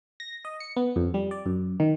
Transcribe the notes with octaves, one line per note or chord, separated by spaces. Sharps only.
A#6
D#5
C#7
B3
F2
G3
D5
F#2
D#3